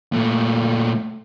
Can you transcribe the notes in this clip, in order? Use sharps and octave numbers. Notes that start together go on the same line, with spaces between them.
A#2 A3